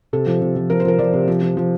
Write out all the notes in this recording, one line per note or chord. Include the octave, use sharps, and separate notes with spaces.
C3 A4
F3
C3
F3
F3 A#4
C5
F3 A#4
F3 D5
C3
F3
F3
F3